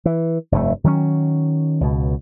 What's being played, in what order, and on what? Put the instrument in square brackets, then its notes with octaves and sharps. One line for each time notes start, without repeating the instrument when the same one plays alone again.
[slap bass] E3
F1 G2 C3 A3
D#3 F#3 G#3 C#4
C#2 B2